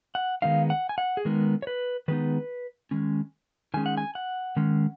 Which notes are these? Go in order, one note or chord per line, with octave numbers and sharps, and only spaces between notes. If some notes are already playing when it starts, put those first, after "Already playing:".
F#5
D#3 G#3 B3 D#4 F5
F#5
G#5
F#5
G#4
D#3 G#3 B3 D#4 A#4
C#5
B4
D#3 G#3 B3 D#4 B4
D#3 G#3 C#4
D#3 G#3 C#4 G#5
F#5
G#5
F#5
D#3 G#3 C#4